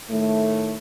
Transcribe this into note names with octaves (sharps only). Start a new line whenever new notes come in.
A2 D#3 A3